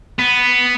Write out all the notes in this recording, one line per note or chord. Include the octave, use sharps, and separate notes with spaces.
B3